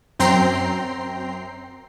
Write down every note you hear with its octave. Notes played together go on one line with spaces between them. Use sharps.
F#2 C4 G5 A#5 C6 C7